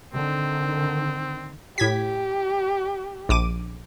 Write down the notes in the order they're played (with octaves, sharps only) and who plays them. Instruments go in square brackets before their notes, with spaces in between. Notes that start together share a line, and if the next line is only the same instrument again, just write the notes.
[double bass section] D3 D#3 [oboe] C4
[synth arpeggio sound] A2 G#6 B6 [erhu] G4
[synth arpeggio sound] A#1 D6 D#7